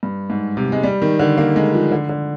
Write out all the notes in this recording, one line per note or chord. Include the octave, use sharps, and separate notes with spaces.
G2
G#2
C3
G#3
G3
D#3
D3
A#3
G#3
F3
D3
D3